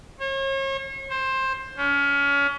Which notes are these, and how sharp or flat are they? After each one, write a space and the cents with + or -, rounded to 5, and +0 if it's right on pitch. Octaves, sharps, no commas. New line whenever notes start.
C#5 -40
C5 +15
C#4 +30